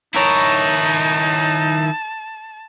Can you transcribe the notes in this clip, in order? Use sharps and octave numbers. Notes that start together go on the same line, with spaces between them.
D#3 D#4 E4 A#4 C#5 A5